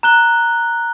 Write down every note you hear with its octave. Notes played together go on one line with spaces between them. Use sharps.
A#5 F#6 G7